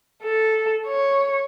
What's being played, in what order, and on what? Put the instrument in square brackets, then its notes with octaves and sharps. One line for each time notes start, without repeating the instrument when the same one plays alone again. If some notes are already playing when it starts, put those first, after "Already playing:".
[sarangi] A4
C#5